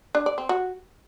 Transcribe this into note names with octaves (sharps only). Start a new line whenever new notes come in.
D4
D5
C4
F#4